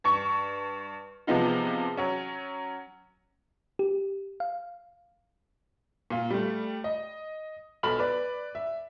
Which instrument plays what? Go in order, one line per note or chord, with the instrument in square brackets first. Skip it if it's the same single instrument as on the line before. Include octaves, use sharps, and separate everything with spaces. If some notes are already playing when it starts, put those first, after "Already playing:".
[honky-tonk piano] G2 C#6
C3 F3 G#3 B3 D#4 F4
F#3 C#4
[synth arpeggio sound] G4
F5
[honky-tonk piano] A#2 F4
G3 A3
D#5
B1 A4 B5 F6 F#7
B4 D5
E5